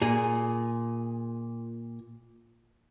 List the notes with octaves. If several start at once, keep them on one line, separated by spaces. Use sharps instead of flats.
A#2 G#4